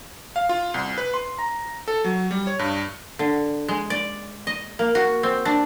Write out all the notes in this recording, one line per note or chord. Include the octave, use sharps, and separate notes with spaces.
F5
F4
C2
B4
C6
A#5
A4
F#3
G3
C#5
G2
D3
G#3
D5
D#5
A#3
F#4
C4
D4